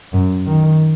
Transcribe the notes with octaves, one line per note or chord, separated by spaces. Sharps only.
F#2
D#3